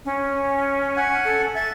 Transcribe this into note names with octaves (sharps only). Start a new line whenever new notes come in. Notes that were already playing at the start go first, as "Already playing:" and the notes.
C#4
F#5 G#5
A4
E5 A6